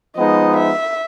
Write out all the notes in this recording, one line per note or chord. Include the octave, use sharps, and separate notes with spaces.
F3 G#3 B3 D#4 D#5
E5